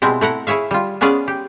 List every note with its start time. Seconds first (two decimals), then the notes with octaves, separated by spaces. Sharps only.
0.02 B2 G3 G#3 C4 E4
0.21 A3 E4 F#5 A#5
0.47 E4 G#4 C#5 E5 F5
0.71 G3 F4
1.01 G#3 B3 C#4 G#4 D5 F5
1.28 G4